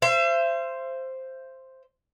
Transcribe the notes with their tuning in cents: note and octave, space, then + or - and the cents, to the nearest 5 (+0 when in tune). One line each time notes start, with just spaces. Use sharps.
C5 +0 E5 +40